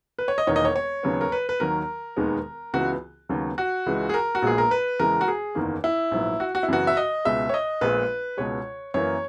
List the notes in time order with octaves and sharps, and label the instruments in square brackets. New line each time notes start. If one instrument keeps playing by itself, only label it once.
[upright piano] B4
C#5
D#5
E1 E2 D#3 A#3 C#5
D#5
C#5
C#5
D#2 C#3 F#3 B3
A#4
B4
B4
D#2 D#3 F#3 A#4
E1 D#2 D#3 G#3 B3
C#2 C#3 E3 B3 F#4
D#2 C#3 F#3 B3
F#4
C#2 C#3 E3 G#3
G#4
A#4
F#4
A#1 A#2 G#3 B3 G#4
A#4
B4
E2 C#3 E3 G#3 B3 A#4
F#4
G#4
F#1 E2 D#3 A#3
E4
A#1 G#2 F#3 B3
F#4
F#4
E4
F#2 C#3 E3 B3 F#4
E5
D#5
C#2 B2 G#3 B3 E5
C#5
D#5
A#1 A#2 G#3 B3 B4
C#2 B2 G#3 C#5
F#2 E3 A#3 C#5